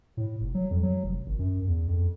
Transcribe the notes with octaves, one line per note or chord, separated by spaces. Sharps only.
A2
F1
F#3
F2
F#3
F1
G#1
F#2
E2
F2